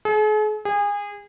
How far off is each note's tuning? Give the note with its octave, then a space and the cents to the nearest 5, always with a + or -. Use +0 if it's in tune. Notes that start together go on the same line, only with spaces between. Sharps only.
G#4 +45
G#4 -30